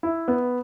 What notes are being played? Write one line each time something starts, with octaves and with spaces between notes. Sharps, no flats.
E4
B3